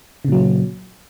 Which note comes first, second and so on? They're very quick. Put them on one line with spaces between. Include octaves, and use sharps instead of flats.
C#3 A#2 F#3